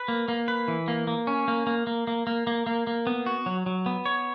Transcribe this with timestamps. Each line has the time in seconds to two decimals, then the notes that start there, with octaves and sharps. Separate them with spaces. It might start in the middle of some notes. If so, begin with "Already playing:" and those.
Already playing: B4
0.08 A#3
0.28 A#3
0.48 B4
0.68 E3
0.88 A#3
1.07 A#3
1.27 C#4
1.48 A#3
1.67 A#3
1.87 A#3
2.07 A#3
2.27 A#3
2.47 A#3
2.67 A#3
2.87 A#3
3.07 B3
3.26 F#4
3.46 F#3
3.66 F#3
3.86 B3
4.06 C#5